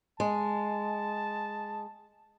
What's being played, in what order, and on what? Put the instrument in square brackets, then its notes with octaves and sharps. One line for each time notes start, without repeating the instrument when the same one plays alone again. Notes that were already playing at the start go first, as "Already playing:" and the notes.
[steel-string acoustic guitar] G#3 [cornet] A5